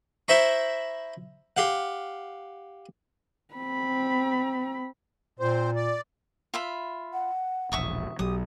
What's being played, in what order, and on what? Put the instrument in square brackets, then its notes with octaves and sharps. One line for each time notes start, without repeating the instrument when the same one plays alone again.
[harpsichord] E4 C5 E5 A#5 B5 C#6
G4 F5 F#5
[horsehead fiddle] C4 B5
[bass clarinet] A#2 [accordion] C4 C5
[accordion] D5
[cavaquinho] F4 E5 B5
[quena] F#5
[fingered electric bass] E1 A#1 [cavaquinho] E5 C#6 D#6
[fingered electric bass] B1 F#3 [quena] G4 [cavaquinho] D#6